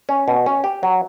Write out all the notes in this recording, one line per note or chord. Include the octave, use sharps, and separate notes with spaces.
C#4
B2
C#4
G4
F#3